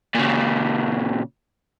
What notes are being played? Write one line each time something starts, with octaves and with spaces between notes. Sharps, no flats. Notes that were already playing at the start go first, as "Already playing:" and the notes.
A#2 C#3